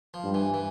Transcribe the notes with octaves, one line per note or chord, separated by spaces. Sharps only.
F3
G2
E3
E3